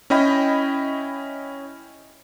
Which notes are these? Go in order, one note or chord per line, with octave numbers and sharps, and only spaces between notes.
C#4 E4 D#5 G5 B5